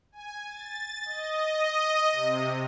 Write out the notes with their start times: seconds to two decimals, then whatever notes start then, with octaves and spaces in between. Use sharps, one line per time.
0.12 G#5
0.46 A6
1.05 D#5
2.11 C3